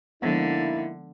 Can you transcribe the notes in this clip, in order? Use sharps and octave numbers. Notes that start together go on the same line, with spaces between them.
D3 F3 G#3 A#3 B3 D#4 E4